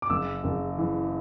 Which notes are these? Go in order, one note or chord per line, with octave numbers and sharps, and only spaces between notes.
D6
F#1 E6
F#1
E3